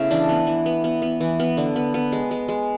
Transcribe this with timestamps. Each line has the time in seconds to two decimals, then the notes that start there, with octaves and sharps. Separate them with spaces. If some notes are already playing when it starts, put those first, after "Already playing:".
Already playing: C#3 A3 B3 E4
0.11 E3 D4
0.29 B3
0.47 E3
0.66 B3
0.84 B3
1.02 B3
1.20 E3
1.40 B3
1.57 D3
1.76 B3
1.94 B3
2.12 G#3
2.31 G#3
2.48 G#3